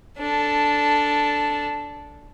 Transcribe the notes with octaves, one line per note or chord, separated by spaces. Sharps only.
D4 A4